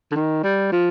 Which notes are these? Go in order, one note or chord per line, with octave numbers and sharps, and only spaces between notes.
D3
D#3
G3
F3